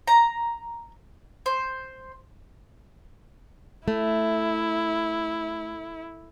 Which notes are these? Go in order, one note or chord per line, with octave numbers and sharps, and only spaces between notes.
A#5
C5
A3 E4